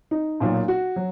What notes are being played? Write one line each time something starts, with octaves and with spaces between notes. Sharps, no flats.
D#4
B1 A#2 F#3
F#4
F#3